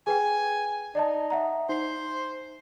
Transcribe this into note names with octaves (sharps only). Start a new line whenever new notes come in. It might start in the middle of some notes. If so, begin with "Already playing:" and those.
G#4 B4 G5 G#5
D#4 D5 D#5 A5
E5 F#5 A#5
D#4 C5 C7